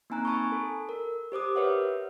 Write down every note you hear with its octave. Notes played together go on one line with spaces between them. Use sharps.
A#3 C4 D#4 G#5 A#5 F#6
G#5 A5 B5 C#6
A4
A#4
G4 C5 D6 D#6
A#4 B4 C#5 E5 F#5